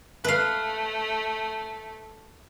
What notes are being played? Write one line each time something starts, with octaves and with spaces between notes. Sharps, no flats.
A3 B4 F5